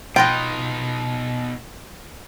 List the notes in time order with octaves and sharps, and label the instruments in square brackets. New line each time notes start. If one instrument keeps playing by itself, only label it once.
[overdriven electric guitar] B2 D#4 [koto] F4 B4 D#5 [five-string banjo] G5